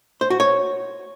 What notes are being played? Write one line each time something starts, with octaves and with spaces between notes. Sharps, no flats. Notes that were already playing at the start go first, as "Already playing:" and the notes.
C5
F#4
C#5